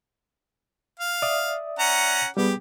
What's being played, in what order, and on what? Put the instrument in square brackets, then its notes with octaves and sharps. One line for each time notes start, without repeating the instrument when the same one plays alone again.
[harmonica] F5
[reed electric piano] D5 E5 D#6
[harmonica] C#4 F#5 A#5
[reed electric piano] G3 B3 G#4 [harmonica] G4